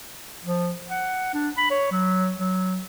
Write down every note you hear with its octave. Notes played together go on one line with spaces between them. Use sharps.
F3
F#5
D4
B5
C#5
F#3
F#3